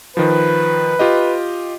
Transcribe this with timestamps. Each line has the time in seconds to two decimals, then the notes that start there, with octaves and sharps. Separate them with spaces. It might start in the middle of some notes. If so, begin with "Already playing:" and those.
0.17 D#3 F3 B4
0.99 F4 G4 D#5